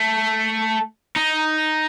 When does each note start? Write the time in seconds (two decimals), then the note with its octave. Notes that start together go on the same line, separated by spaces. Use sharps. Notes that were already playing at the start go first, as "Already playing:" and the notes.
Already playing: A3
1.16 D#4